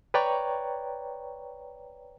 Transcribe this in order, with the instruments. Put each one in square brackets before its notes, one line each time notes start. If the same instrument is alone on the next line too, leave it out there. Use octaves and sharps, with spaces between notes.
[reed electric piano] B4 C#5 D5 G5 A#5 C#6